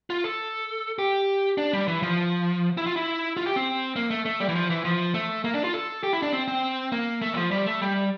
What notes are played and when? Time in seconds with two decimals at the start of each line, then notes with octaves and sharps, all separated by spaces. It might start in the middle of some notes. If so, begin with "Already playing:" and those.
0.10 F4
0.24 A4
0.99 G4
1.58 D4
1.73 G3
1.88 E3
2.02 F3
2.77 E4
2.87 F4
2.96 E4
3.37 F4
3.46 G4
3.56 C4
3.96 A#3
4.10 A3
4.26 A3
4.40 G3
4.49 E3
4.55 F3
4.70 E3
4.85 F3
5.14 A3
5.44 A#3
5.54 D4
5.64 F4
5.74 A4
6.03 G4
6.13 E4
6.22 D4
6.33 C4
6.48 C4
6.92 A#3
7.22 A3
7.33 G3
7.36 F3
7.51 G3
7.66 A3
7.82 G3